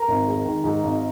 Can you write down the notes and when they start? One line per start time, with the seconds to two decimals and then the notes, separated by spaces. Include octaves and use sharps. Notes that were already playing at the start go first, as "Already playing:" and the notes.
Already playing: A#4 A#5
0.08 G#1
0.27 G#3
0.45 D#3
0.64 G#2
0.83 G#1